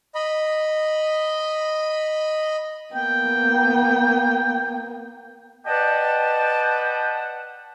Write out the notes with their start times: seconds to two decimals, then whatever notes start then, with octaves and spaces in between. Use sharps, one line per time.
0.15 D#5 B5
2.94 A#3 B3 G5
5.66 B4 D5 D#5 F#5 G5 A5